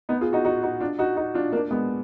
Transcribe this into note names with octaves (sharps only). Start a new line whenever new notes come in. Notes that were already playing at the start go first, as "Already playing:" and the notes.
B3 D#4
F4 G#4
D#4 F#4
D#4 F#4
D#4 F#4
D4 F4
D#4 F#4
D#4 F#4
D4 F4
A#3 D4
G#3 B3